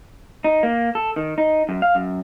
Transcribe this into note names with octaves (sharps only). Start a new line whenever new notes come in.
D#4
A#3
A4
D#3
D#4
F#2
F5
F#2